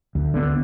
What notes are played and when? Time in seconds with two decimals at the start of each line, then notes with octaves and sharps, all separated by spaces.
0.15 D2
0.34 D3 B3